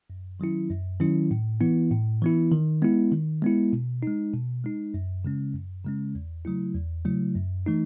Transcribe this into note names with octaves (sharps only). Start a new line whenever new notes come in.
F#2
D#3 F#3 C#4 E4
F#2
D#3 F#3 C#4 E4
A2
E3 B3 E4
A2
E3 B3 E4
D#3
G#3 B3 E4
D#3
G#3 B3 E4
B2
G#3 D#4
B2
G#3 D#4
F#2
C#3 G#3 C#4
F#2
C#3 G#3 C#4
E2
C#3 F#3 A3 E4
E2
C#3 F#3 A3 E4
F#2
E3 A3 D#4